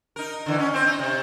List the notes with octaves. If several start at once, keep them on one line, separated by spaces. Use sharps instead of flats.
D#4 A#4
D3 E3
C#4
C4 C5
D#4
C3